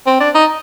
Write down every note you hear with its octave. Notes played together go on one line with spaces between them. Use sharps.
C4
D4
D#4